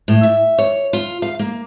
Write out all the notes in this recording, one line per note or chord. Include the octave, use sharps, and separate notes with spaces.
A2
E5
C#5
F4
F5
A#3